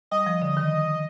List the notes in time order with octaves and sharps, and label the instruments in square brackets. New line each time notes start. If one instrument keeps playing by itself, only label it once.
[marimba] G3 [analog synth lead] D#5
[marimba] F3
D3
D#3